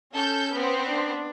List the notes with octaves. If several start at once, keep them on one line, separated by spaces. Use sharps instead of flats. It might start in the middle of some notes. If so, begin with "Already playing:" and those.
C#4 A4 G6
B3 C4
D4